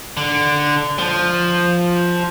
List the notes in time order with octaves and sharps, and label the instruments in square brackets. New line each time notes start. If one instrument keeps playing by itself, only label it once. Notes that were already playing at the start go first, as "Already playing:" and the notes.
[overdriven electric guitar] D3
F3